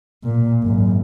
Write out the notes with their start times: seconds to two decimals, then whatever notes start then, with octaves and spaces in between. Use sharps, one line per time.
0.24 A#2
0.63 G#1 F#2